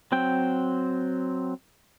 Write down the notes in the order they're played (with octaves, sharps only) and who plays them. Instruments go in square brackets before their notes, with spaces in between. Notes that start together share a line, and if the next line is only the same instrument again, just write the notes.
[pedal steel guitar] F#3 C4 G5